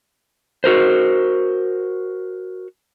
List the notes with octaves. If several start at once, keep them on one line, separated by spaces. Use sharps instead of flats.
F#4 A#4 C5